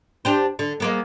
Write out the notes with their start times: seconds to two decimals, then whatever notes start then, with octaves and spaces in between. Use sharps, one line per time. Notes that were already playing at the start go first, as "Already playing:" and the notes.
0.25 D4 G4 C5
0.59 D3
0.80 G#3 A#3 B3